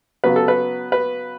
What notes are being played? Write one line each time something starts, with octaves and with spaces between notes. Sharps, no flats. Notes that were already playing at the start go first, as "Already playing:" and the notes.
C#3 F#3 B3 B4
A4
B4
B4